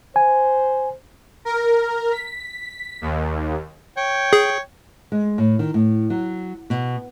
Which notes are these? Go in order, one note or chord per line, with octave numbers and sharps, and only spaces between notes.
C5 G#5
A#4
B6
D#2
C#5 G5
G#4
G#3
A2
D#3
A2
F#3
B2